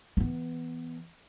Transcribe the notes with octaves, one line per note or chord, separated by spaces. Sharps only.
E3 B3